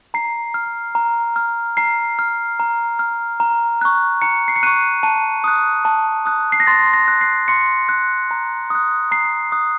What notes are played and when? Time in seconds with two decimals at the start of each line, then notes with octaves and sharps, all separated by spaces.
0.14 A#5 C7
0.54 F6
0.95 A#5
1.36 F6
1.77 A#5 C7
2.19 F6
2.59 A#5
2.99 F6
3.40 A#5
3.81 C#6 F#6
4.22 A#5 C#7
4.48 C7
4.56 C#7
4.63 C#6 F#6 D#7
5.03 A5 D#7
5.44 D#6 F#6
5.85 A5
6.26 D#6 F#6
6.52 C7
6.60 A#6
6.67 C6 A6
6.94 A#6
7.08 F#6
7.21 C7
7.48 C6 C#7
7.89 F#6
8.31 A#5
8.70 D#6 F#6
9.11 A#5 C7
9.52 D#6 F#6